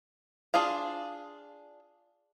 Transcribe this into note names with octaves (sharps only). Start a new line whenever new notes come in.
D4 F4 G#4 F5